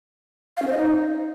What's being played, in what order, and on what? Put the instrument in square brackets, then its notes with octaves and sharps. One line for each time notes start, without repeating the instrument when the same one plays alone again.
[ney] F5
C#4
C5
D#5
D#4